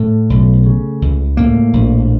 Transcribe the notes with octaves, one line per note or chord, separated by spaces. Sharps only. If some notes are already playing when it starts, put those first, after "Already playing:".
Already playing: A2 A3
B1
C#3
C#2
A2 A#3
A#1